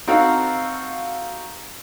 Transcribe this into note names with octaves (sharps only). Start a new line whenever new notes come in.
C4 D#4 F#4 A4 F5 F#5